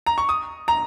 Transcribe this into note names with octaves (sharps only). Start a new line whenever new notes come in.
A#5
C#6
D#6
A#5